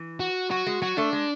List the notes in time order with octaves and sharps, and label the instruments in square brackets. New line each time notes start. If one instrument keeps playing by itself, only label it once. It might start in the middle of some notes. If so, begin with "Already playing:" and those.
Already playing: [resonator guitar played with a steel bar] E3
[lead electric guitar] F#4
[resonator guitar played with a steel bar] F#3 [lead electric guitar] F#4
[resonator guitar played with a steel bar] G#3
[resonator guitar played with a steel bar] F#3 [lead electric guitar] F#4
[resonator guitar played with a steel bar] A3 [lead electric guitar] D4
[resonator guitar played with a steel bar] G#3